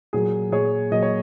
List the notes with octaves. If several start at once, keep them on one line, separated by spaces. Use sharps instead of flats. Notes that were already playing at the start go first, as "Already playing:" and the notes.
A#2 F#3 A#3 G#4
A#2 F#3 A#3 G#4 C#5
A#2 F#3 A#3 D#5
C#5